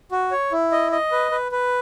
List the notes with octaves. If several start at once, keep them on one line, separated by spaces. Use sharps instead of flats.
F#4
C#5
E4
D#5
D#5
B4
B4
B4